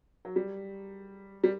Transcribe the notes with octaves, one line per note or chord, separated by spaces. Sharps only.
F#3
G3
G3